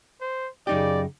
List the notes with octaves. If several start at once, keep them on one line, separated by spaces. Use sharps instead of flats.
C5
F#2 C#3 D#4 G4 D5